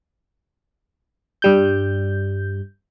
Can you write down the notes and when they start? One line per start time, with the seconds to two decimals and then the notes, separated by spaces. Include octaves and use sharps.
1.42 G2 G3 G6